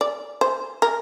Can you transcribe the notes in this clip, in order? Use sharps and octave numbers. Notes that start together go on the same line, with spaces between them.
D5
C5
A#4